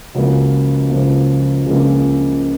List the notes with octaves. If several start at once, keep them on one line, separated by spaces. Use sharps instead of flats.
C#2 C#3 F3 A#3 F#4
C#2 C#3 F3 A#3
C#2 C#3 F3 A#3 G#4